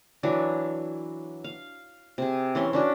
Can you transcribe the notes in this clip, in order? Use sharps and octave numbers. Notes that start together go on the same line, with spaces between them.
E3 F#3 D4
F5
C3 G#4
E3 C#4 C6
C#4 D4 F#4